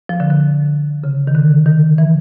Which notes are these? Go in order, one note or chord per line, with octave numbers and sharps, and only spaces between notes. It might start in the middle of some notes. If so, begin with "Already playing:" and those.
F3
D3
D3
C#3
D#3
D3
D#3
E3